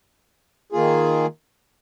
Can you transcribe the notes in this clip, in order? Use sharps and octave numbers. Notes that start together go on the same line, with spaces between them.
D#3 A#3 F4 G#4